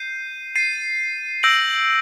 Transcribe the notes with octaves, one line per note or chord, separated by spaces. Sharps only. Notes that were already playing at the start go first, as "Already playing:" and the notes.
Already playing: G6 C7 D#7
A6 C7 D#7
E6 G6 A#6 D7 F#7